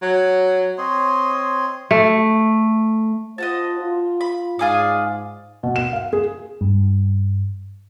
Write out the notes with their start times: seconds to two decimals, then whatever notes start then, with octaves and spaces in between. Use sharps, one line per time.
0.02 F#3
0.78 C4 C#5 D#5 C6
1.91 A3
3.38 F4 C5 D#5 F#5 A5
3.80 F4
4.21 B5
4.59 G#2 F4 G#4 D5
5.63 B2
5.76 E7
5.93 F5
6.13 G#4
6.61 G2